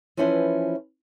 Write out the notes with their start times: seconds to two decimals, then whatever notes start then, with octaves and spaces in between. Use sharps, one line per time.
0.17 E3 F3 C#4 E4 B4 C5